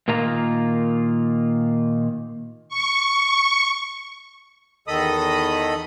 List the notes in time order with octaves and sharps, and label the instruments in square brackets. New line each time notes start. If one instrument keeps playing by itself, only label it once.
[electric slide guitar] A#2 D#3 A#3 F4 A#5
[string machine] C#6
[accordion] E2 D#3 A4 D#5 B5 D#6